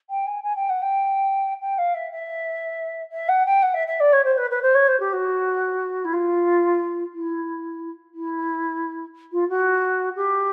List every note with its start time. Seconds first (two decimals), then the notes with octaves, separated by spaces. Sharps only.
0.10 G5
0.26 G#5
0.43 G#5
0.56 G5
0.69 F#5
0.82 G5
1.61 G5
1.78 F5
1.94 E5
2.11 E5
3.12 E5
3.28 F#5
3.46 G5
3.62 F#5
3.74 E5
3.87 E5
4.00 D5
4.12 C#5
4.24 C5
4.37 B4
4.50 B4
4.62 C5
4.74 C#5
4.87 C5
5.00 G4
5.13 F#4
6.04 E4
6.13 F4
7.13 E4
8.14 E4
9.32 F4
9.49 F#4
10.16 G4